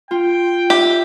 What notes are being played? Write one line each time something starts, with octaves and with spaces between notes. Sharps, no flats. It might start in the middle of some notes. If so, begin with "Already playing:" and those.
F4 G5
G4 E5